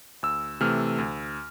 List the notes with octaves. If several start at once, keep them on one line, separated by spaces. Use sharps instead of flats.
D2 E6
C3 E3 A3 F6
D2